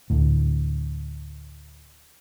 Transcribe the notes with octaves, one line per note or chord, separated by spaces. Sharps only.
D2 A2